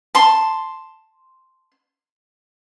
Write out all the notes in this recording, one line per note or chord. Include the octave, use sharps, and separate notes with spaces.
A5 C6